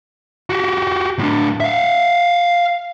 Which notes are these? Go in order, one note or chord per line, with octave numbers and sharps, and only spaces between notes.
F#4 G4
A2 D4
E5 F5